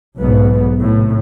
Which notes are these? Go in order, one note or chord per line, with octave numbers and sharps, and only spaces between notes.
B1 G#2 B3
A2 C3